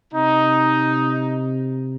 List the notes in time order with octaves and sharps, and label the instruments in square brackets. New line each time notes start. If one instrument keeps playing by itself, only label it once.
[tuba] C3 [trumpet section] D#4